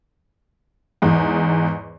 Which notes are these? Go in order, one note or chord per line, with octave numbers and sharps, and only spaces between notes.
E2 G#2